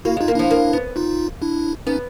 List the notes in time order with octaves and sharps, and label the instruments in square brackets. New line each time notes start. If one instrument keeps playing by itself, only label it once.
[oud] A#3 [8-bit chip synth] E4 F#4
[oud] G#3 [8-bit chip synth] D#4 F4
[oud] A#3
[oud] F3 [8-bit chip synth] D4 E4
[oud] A#3
B3
[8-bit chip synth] D#4 F4
D4 E4
[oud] B3 [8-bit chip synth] C#4 D#4